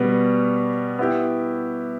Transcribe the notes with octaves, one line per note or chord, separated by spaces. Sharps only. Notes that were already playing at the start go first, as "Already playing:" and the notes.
Already playing: B2 G3 B3
B3 E4 G4